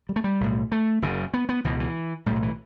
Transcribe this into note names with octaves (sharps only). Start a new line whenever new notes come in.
G3
A3
G3
B1 A2
A3
F#1 F#2 C#3
B3
B3
C#2 B2 E3
E3
B1 A2 G3
F#3
E3